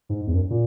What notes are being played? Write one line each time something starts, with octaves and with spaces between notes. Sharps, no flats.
G#2
E2
F#2
A#2